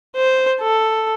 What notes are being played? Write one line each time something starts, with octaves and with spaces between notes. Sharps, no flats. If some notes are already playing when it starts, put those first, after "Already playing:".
C5
A4